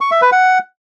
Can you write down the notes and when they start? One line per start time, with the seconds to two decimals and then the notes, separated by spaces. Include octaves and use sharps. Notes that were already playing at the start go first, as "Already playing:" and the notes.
0.01 C#6
0.11 E5
0.22 B4
0.32 F#5